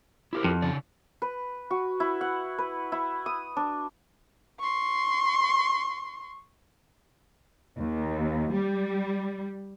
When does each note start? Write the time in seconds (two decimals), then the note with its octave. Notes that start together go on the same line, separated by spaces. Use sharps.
0.33 E4 G4 A#4
0.44 F2
0.62 C#3 D5
1.22 B4
1.71 F#4
2.00 E4
2.21 F#5
2.58 B4
2.92 E4
3.26 D#6
3.56 D4
4.60 C6 C#6
7.77 D#2
8.53 G3